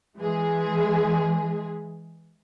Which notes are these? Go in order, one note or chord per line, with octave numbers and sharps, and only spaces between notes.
E3 G#3 G#4